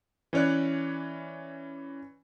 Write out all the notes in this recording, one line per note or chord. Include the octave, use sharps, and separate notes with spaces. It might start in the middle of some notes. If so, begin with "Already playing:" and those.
E3 C#4 C#5 D5 F#6